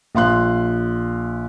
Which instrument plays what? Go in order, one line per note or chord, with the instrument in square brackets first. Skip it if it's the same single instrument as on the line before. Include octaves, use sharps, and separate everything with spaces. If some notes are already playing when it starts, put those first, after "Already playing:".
[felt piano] A#1 F5 C6 F#6